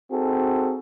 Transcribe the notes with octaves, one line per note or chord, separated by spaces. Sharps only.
C4 D#4 F#4 G#4 A4